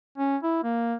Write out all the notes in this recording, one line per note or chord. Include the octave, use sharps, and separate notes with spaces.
C#4
E4
A#3